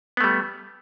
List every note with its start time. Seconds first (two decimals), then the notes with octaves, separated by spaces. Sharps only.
0.17 B3
0.21 A3
0.24 G3